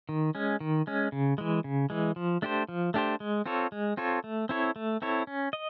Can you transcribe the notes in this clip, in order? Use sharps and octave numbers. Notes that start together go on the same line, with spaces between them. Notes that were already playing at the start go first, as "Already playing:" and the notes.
D#3
G#3 C#4
D#3
G#3 C#4
C#3
E3 G#3
C#3
E3 G#3
F3
A3 D4 G4 C5
F3
A3 D4 G4 C5
G#3
C4 F4 A4 C#5
G#3
C4 F4 A4 C#5
A3
C4 E4 A4 C#5
A3
C4 E4 A4 C#5
C#4
D#5